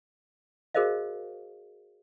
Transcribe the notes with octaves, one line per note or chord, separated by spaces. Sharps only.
F#4 G#4 A#4 C5 D#5 F5